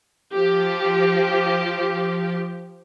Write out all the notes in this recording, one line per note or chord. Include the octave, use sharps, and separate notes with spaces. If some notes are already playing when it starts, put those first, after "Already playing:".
F3 G4